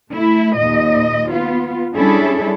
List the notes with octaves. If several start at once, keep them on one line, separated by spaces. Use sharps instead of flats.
A3 E4
D#2 A#2 D#5
B3 F4
G3 C#4 D4 E4 G#4 A4